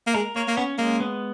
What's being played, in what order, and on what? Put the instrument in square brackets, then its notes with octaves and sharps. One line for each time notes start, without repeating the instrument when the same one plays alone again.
[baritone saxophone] A#3
[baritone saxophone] G#3 [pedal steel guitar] A#4
[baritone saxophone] A#3 [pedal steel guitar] C#5
[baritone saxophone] A#3
[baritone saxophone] B3 [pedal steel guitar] C#4
[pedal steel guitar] G#3 [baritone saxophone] A#3
[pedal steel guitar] B3